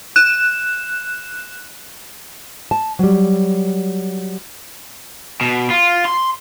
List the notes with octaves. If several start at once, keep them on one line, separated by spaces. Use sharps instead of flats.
F#6 E7
A5
F#3 G3
B2
F4
C6